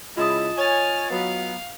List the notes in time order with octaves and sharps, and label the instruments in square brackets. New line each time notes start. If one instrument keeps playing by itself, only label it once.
[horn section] C#3 G#3 E4 [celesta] F4 D#5 D#6 [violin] A5
[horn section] C#5 G#5 [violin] F6 A6
[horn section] F#3 B3 [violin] F5